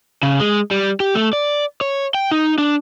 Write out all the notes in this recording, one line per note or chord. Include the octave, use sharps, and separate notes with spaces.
C#3
G#3
G3
G4
A3
D5
C#5
G5
D#4
D4